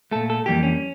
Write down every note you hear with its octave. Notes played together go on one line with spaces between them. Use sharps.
A#2 A3 A4
A4
F2 E3 G3 A#3 G4
C#4